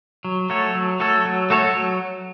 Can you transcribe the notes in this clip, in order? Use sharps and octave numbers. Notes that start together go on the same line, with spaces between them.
F#3
A3 F#4 A4 C#5
F#3
A3 F#4 A4 C#5
F#3
A3 F#4 A4 C#5
F#3